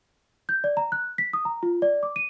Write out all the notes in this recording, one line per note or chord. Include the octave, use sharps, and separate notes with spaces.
G6
D5
A#5
F#6
B6
D#6
A#5
F4
D5
D6
D#7